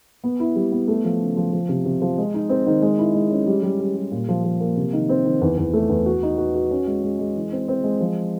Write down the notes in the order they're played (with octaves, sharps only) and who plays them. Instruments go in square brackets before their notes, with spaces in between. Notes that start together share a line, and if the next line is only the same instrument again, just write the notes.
[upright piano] B3
E4
G3
B3
A3
F3
C#3
F3
F3
C3
C3
F3
G#3
D#4
C4
D#3
G#3
E4
G#3
C#4
G3
G3
G3
G3
A#2
F3
F3
A#3
C3
D#3
C4
D#3
E2
E2
A3
E2
F#4
D#4
F#4
F#4
C#4
G#3
G#3
G#3
E3
C4
C4
G#3
F3